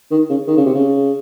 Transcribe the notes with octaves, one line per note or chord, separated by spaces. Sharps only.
D#3
C#3
D#3
C#3
C3
C#3